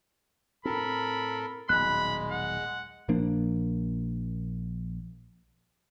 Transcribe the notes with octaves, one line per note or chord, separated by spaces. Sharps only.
A2 C4 A4 A#4 B5
D#1 B1 G#3 B5 F#6
F#5
A#1 F3 A#3 D4